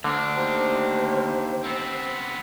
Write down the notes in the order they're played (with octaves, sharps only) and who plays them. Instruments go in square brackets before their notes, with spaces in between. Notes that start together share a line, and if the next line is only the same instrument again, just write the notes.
[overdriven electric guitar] D2 D4 [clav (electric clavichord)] D3
[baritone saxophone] D#2 [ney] C5
[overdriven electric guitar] B3 C4